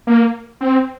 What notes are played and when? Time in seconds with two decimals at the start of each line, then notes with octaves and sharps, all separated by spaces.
0.07 A#3
0.61 C4